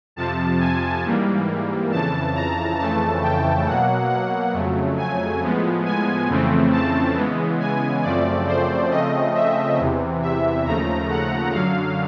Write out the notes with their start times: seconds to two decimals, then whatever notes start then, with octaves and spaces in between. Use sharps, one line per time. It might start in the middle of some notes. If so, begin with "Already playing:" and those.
0.16 F2 C3 F3 A5
0.60 G#5
1.04 G#2 E3 G3 A#3
1.91 F2 C#3 E3 A5
2.35 A#5
2.79 F2 C#3 E3 A3 A5
3.22 G5
3.66 B2 F#3 A#3 F#5
4.10 F#5
4.53 F2 C#3 F#3 A3
4.97 G#5
5.41 A2 F3 G#3 B3
5.85 G#5
6.28 F2 C#3 E3 A3 C4
6.72 A5
7.16 C#3 E3 G#3 B3
7.59 G#5
8.03 F#2 C#3 F3 A3 C4 D5
8.47 C5
8.91 C#3 F3 A3 C4 D#5
9.34 E5
9.79 E2 C3 E3
10.22 E5
10.65 D#2 C#3 F3 A3 A#5
11.09 F#5
11.53 F#2 D3 F#3 F5